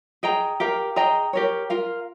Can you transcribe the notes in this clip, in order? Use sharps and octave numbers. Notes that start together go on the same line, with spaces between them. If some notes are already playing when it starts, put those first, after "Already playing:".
G#4 D#5 G5 A#5
G4 A#4 F5 A#5
G#4 D#5 G5 A#5
G4 A#4 C#5
F4 A#4 F5